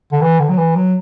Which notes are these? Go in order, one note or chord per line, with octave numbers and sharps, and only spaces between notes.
D3
E3
D3
F#3
E3
F#3